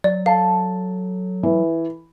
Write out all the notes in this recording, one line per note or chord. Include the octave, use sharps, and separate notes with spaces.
F#3 D5
A4 F5
E3